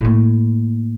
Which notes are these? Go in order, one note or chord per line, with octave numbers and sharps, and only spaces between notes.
A2 A#3